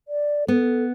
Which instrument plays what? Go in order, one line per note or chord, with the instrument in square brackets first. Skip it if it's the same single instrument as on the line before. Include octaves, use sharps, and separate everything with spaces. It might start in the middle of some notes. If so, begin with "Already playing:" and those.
[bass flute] D5
[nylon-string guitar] B3 [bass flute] A4